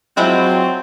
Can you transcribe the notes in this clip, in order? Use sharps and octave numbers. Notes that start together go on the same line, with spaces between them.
F3 F#3 G#3 C4 E4